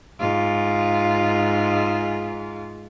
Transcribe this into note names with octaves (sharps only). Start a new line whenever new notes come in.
G#2 F4